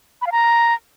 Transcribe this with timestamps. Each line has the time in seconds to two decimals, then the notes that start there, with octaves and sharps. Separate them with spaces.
0.22 B5
0.27 F5
0.32 A#5